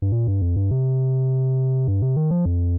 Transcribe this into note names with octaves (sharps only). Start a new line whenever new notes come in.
G2
A#2
G2
F2
G2
C3
G2
C3
D#3
F3
F2